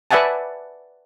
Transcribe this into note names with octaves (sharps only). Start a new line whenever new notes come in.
B4 D5 E5 F#5 G#5 A5